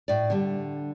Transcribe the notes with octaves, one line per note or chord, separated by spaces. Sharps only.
A2 D5
D3 G3